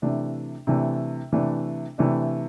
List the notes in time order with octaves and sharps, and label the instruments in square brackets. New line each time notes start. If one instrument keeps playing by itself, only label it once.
[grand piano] C3 E3 A3 D4
C3 E3 A3 D4
C3 E3 A3 D4
C3 E3 A3 D4